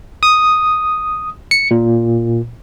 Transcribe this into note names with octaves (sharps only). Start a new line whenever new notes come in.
D#6
C#7
A#2